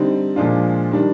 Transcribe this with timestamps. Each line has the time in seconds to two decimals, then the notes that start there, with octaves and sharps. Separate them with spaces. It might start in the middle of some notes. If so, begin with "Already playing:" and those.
Already playing: D3 G3 C4 D#4
0.36 A#2 F3 G#3 D4 F4
0.92 D#3 G3 D4